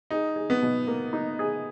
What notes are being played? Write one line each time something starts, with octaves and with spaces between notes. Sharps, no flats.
D#4 G#4
G#4
B3
B2
A#3
D#4
G#4